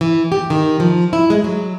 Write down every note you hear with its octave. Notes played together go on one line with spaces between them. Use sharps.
E3
G4
D#3
F3
E4
G#3
F#3